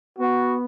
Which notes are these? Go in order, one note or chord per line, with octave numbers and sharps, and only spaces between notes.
B3 F#4